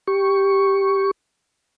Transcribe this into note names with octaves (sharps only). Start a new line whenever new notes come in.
G4 C#6